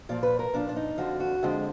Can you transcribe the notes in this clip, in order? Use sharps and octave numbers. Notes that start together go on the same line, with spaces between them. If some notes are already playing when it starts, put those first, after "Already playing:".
A#2 F3 D5
B4
A#4
A#2 F3 D4
D4
D#4
F2 D3 F3 F#4
F#4
F2 D3 F3 G#3